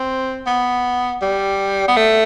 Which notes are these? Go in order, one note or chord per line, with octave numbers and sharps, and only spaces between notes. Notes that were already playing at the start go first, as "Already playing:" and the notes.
Already playing: C4
B3
G3
B3
A3